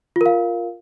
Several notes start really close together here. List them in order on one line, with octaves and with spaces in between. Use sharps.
F4 A#4 F5